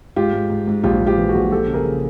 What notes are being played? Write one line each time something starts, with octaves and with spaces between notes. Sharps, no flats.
G#2 F4 G4
G#2
G#2
G#2
A#1 F4 G4
A#1
F4 G4
E3
F#4 G#4
A#1
F3 G4 A4
C#3
G#4 A#4
C#3